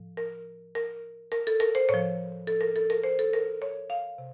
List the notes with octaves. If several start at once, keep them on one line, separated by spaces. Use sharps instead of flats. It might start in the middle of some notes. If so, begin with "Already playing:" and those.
Already playing: A2 F3
A#4
A#4
A#4
A4
A#4
C5
A2 F3 C#5
A4
A#4
A4
A#4
C5
A4
A#4
C#5
F5
C3